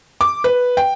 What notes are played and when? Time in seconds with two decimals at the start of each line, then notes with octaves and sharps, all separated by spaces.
0.21 D6
0.44 B4
0.77 G5